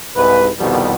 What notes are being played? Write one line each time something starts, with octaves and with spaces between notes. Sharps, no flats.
C2 G#2 B4
C2 F2 B2 D#3 G3 B3